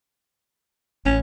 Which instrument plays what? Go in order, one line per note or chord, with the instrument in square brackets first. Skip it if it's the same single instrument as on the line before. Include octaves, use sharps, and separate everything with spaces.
[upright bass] A1 [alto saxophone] C#4